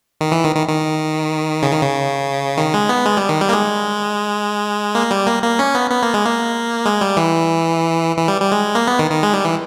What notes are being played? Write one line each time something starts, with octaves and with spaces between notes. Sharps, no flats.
D#3
E3
D#3
D#3
D#3
C#3
D#3
C#3
D#3
G#3
B3
G#3
G3
D#3
G3
A#3
G#3
A#3
G3
A#3
A#3
C#4
B3
B3
A#3
G#3
A#3
G#3
G3
E3
E3
G3
G3
G#3
A#3
B3
D#3
D#3
G#3
G3
E3